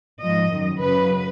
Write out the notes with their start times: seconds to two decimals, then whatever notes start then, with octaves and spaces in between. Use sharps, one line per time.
0.21 G#2 F3 D#5
0.51 F#2 D#3 F#3
0.81 F#2 C#3 F#3 B4